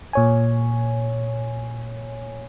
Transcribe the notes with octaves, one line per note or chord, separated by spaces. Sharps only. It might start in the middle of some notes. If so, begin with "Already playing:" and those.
A#2 C#5 G#5